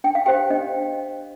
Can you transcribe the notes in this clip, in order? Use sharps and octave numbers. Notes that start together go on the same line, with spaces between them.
D4 G5
F5
G4 C5 G5
D4 D#5